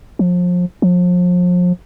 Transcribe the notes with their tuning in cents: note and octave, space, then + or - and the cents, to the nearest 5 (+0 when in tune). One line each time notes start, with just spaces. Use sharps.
F3 +30
F3 +35